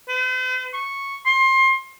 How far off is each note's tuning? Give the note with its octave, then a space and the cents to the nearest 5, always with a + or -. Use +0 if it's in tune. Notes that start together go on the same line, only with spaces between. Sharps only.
C5 -45
C#6 -5
C6 +25